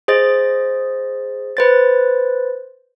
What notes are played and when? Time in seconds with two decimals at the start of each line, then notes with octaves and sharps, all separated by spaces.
0.08 G#4 C5 D#5 A6
1.57 B4 C5 A6